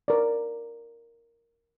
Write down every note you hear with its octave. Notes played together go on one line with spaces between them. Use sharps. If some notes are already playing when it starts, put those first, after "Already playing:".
A#4 D5